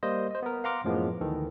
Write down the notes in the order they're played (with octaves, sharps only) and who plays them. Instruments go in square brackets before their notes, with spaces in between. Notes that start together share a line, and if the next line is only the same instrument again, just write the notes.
[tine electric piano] G3 A#3 C5 D#5
C5 D#5
B3 A#4
F5 F#5 A#5 C6 D6 F6
F#2 A2 F3 G#3 A#3 B3
D2 D#3 E3 A4